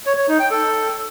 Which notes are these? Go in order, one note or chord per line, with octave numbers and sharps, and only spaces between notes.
C#5
C#5
D#4
G5
A4